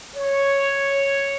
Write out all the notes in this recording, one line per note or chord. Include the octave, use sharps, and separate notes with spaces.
C#5